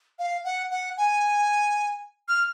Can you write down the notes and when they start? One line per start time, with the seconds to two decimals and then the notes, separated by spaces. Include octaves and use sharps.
0.19 F5
0.44 F#5
0.71 F#5
0.97 G#5
2.28 F6